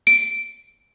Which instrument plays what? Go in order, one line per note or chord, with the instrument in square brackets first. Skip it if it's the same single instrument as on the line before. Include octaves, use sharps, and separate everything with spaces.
[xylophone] D7